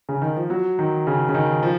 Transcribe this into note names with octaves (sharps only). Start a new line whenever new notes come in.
C#3
D#3
F3
F#3
D#3
C#3
C#3
D#3
F3